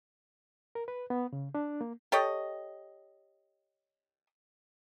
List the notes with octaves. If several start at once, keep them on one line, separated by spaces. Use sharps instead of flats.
A#4
B4
B3
C#3
D4
A#3
G4 A4 C#5 D#5